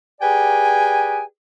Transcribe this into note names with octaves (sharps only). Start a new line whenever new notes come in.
G4 G#4 B4 D5 G5 G#5